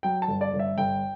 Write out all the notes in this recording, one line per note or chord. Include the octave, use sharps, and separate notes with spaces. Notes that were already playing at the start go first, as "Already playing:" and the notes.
F#3 G5
A5
G1
D5
G1
E5
G1 G5